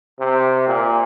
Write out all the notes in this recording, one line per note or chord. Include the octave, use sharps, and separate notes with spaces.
C3
A#2